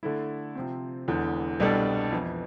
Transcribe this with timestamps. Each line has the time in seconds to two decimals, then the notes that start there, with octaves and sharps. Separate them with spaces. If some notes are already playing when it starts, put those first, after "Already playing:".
0.03 D3 A3 E4
0.55 C3 F3 C4
1.08 E1 E2 D3
1.60 C2 B2 G3 D4 A4
2.12 F2 E3 B3 E4